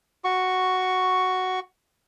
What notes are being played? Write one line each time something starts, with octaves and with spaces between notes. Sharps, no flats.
F#4 C#6